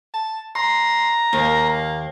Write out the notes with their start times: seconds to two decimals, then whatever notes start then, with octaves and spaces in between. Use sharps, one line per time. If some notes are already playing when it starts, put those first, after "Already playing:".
0.14 A5
0.55 A#5 C6
1.33 D#2 A#3